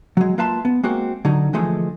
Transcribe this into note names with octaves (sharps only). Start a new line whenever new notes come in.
F#3 G#3
A#3 F4 B4 E5 A5 C6
B3
G#3 A#3 C4 F#4
D3 F#3 D#4
D3 E3 F3 G#3 A3